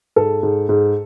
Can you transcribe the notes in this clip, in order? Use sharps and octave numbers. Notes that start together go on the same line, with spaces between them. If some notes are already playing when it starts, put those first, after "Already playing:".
G#2 A4
G#2
G#2